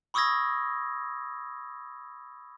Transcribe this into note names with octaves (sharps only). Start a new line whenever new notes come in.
B5 C#6 D#6 E6 G#6 A#6